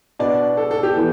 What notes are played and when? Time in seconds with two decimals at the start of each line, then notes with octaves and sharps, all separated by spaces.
0.19 B2 B3 D4 D5
0.57 A4
0.71 A4
0.83 G4
0.96 E3 B3